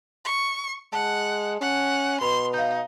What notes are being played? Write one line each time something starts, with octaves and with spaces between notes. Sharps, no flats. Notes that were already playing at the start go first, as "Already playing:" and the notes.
C#6
G#3 F#5 A5
C#4 F#5
B2 B4 B5 C6 F7
D#4 F5 G6